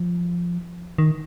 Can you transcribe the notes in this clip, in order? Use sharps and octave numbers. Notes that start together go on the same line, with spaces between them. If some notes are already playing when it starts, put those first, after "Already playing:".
Already playing: F3
D#3